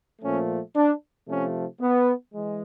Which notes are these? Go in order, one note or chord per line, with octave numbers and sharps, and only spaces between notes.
A#2 F3 A3 C#4
D4
C3 F3 A3 C#4
B3
E3 G#3